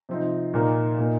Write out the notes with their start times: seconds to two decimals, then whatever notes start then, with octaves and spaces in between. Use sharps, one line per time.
0.09 C3 F3 C4 D#4
0.54 A#2 A#3 D#4
0.98 A#2 A#3 D#4